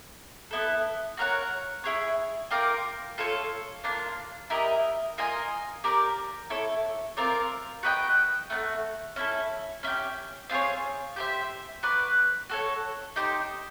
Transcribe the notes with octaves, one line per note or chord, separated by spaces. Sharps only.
B3 E4 A4
F#4 A#4 C#5 F#5
E4 G#4 C#5
F4 A#4 D5 G5
F4 A4 C#5
A#3 D4 F4
E4 G4 A#4 D#5
F4 A#4 D#5 G#5
G4 A#4 D5
E4 A4 C#5
C4 F4 A#4 D5
F#4 B4 D#5 G5
A3 D4 F#4
C#4 E4 A4
C#4 E4 G4
C4 F4 G#4 C#5
G4 C5 E5
F#4 B4 D5
F#4 A4 C#5
D#4 G4 C5